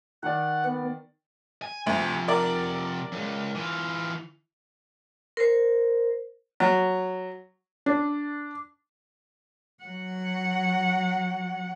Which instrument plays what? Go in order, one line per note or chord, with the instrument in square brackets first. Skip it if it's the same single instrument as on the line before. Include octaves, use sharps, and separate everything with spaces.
[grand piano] D#3 D5 [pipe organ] F#5
[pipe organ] B3
[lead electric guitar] G#5
[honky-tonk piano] D2 [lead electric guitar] C3 F3
[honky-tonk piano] A#4 D5
[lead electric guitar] C#2 F#2
E3 F4
[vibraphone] A#4 C5
[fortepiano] F#3
[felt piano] D4
[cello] F#3 F#5